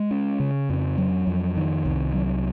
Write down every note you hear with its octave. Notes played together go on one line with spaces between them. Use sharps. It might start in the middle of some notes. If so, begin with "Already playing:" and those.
Already playing: G#3
C#4
C#3
F2
F#3
F2
D#3
C2
F#3